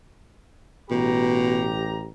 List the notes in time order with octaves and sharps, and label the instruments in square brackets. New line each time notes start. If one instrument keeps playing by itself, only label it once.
[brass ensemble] A1 G4 A#5 [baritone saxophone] B2